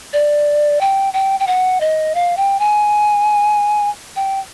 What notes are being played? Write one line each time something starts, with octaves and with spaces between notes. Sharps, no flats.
D5
G5
G5
G5
F#5
D#5
F5
G5
G#5
G5